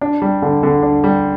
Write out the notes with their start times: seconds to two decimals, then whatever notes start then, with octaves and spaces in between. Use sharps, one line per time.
0.01 D4
0.22 G3
0.42 D3
0.63 D3
0.83 D4
1.04 G3